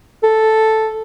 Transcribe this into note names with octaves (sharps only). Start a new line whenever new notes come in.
A4